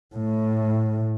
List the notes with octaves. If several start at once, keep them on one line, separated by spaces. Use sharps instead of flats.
A2